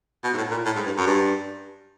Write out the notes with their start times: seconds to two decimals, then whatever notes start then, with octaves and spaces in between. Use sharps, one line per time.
0.24 B2
0.33 G#2
0.37 A2
0.51 A#2
0.65 A2
0.75 G#2
0.86 G2
0.97 F#2
1.07 G2